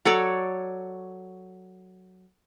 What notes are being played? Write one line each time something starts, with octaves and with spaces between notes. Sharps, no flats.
F#3 A4 C#5 D5